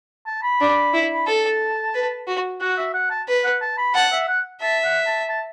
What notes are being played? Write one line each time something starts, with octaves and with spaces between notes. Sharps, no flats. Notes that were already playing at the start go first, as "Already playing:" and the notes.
A5
B5
D4
E4
B5
A4 A5
B4
F#4
F#4 F#5
E5
F#5
A5
B4
F#5
A5
B5
F#5 A5
E5
F#5
E5 A5
F#5
A5
A5